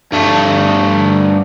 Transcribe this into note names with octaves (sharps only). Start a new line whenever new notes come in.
G2 A3